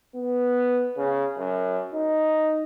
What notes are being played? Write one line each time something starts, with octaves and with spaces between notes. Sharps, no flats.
B3
C#3
F#2
D#4